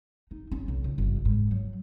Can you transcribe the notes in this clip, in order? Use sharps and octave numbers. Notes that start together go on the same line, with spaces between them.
D#4
C#4
B1
C#2
G1
G#2
F#3